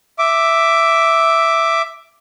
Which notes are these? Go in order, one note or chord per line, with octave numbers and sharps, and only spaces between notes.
E5 D6